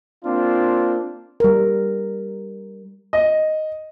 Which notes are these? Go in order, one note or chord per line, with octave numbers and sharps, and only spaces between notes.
A#3 C4 D4 F4
G3 A#4
D#5